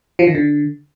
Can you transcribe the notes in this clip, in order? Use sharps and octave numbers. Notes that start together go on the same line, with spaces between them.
F3
D#3
D3